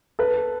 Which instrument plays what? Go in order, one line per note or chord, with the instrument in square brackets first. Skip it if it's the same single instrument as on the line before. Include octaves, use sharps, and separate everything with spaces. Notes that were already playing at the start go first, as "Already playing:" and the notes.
[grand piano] A4 B4